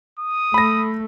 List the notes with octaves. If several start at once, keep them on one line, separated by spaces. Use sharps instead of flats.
D#6
A3 B5 A#6